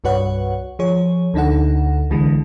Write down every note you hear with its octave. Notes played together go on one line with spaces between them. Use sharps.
C2 G2 F#4 B4 C#5 F#5
F3 G#4 C#5
D2 D3 D#4 A4 F#5
C2 D3 E3 G#3